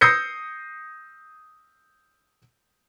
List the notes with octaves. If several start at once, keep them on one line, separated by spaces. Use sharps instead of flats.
D#6 E6 G6 A#6 C7 C#7